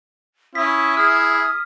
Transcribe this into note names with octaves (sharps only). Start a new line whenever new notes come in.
C#4 E4 D#6 B6
G#4 F6